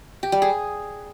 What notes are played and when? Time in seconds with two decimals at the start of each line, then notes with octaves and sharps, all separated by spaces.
0.23 G4
0.32 G3
0.42 G#4